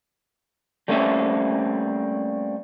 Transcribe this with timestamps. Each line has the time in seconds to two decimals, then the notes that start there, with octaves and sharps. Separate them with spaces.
0.88 G3 A3 A#3 C4 C#4 E5